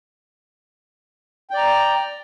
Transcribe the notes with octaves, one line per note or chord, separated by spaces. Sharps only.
D5 G5 A#5